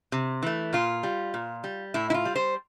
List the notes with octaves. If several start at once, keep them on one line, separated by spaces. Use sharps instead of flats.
C3
E3 A3
A#2 F4
G3
A#2
G3
A2 E4
E4
F4
G3
C5